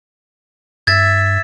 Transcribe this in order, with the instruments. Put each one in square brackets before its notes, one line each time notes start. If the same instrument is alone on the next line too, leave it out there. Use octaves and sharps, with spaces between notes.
[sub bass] G2 [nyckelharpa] E5 [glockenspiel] G#6 A6